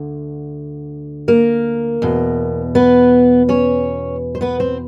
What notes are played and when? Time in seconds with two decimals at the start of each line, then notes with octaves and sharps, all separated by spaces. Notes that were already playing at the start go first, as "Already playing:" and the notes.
Already playing: D2 D3
1.28 A#3 A#4
2.02 E2 B2
2.75 B3 B4
3.49 C#4 C#5
4.35 C5
4.41 B3 B4
4.60 C4 C5